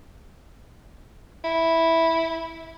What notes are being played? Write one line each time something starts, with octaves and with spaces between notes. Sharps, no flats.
E4